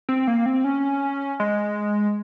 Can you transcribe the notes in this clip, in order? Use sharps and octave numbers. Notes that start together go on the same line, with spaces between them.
C4
A#3
C4
C#4
G#3